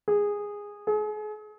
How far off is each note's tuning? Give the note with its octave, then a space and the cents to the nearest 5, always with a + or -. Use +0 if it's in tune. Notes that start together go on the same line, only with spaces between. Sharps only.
G#4 -15
G#4 +35